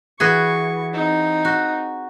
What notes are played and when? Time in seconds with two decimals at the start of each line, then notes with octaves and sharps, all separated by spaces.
0.20 E3 F#4 G#4 C#6
0.94 C4 D#4
1.45 F#4